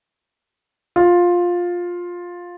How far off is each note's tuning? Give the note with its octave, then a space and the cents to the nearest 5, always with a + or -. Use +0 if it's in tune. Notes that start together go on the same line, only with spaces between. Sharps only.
F4 +10